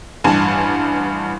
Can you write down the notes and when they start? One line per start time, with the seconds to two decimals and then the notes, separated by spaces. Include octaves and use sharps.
0.24 A1 G2 G#5 A5